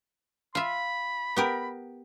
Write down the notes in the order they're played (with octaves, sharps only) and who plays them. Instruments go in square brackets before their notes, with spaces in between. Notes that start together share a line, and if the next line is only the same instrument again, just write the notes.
[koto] F4 E5 [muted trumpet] B5
[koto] B3 G4 A#4